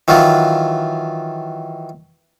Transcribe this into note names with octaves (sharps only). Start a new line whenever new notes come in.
D#3 E3 F#3 F4